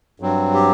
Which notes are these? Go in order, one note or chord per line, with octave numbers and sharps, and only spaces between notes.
G2 F#3 C4
G4